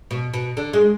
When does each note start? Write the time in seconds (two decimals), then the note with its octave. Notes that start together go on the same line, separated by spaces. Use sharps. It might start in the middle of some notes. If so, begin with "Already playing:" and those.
0.11 B2
0.34 B2
0.57 D3
0.73 G#3